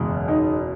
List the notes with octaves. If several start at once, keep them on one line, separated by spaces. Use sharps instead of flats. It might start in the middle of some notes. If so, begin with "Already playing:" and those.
Already playing: F#1 E2 B2 G#3
D#4